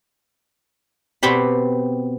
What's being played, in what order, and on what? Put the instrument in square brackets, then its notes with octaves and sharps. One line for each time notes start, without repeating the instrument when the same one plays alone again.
[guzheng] B2 B3 C4 G4 B5